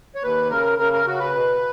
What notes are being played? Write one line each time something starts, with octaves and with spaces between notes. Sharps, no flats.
C#5
D#2 B4
C#3 A#4
C#3 A#4
A#4
C#3 F#4
B4
B2